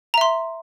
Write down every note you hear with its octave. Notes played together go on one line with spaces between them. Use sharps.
E5 A#5 C6